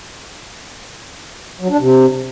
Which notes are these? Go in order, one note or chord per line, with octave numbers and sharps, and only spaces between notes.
F#3
D4
C3